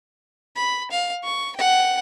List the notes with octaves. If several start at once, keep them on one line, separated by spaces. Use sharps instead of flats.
B5
F5
C#6
F#5 G5